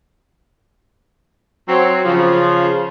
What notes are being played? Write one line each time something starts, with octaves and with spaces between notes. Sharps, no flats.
F#3 C4
C#3 F3